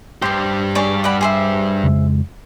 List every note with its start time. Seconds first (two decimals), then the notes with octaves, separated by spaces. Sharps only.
0.22 G2 G4 C5 C6
0.75 G#4 C#5 D5
1.04 D5 F#5 B5
1.21 G#4 C5 E5
1.83 F2 C#3 G#3